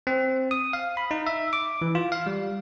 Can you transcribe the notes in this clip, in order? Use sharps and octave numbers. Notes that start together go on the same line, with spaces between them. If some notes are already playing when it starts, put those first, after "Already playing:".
C4
D#6
F5
B5
D#4
E5
D6
E3
F4
F5
G3